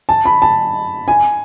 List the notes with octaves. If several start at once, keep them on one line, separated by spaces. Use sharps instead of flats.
A5
B5
A5
G#5